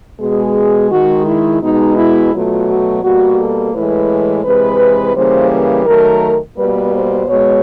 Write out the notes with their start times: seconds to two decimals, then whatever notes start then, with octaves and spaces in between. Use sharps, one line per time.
0.20 B2 G#3 G#4
0.91 D#3 G#3 F#4
1.26 E4
1.62 B2 G#3 D#4
1.97 E4
2.32 B2 F#3 A3 F4
2.68 F#4
3.03 B2 G3 A#3 F#4
3.38 A4
3.74 A2 E3 G#3 B4
4.45 C3 E3 G#3 B4
5.15 C#3 E3 G3 A#3 C5
5.51 B4
5.86 D#3 F#3 A3 A#4
6.56 B2 G3 A#3 B4
6.93 C5
7.27 B2 G#3 C#5